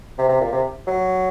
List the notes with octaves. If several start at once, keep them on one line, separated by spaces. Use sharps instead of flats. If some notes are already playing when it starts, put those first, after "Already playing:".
C3
C3
A#2
C3
F#3